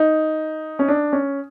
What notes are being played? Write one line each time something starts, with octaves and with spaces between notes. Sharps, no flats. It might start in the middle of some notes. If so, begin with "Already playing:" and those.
Already playing: D#4
C#4
D4
C#4